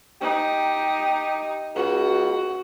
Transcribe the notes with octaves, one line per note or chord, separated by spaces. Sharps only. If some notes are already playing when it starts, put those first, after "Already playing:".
D#4 G4
C#2 F#4